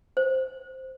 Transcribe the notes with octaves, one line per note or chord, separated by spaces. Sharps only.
C5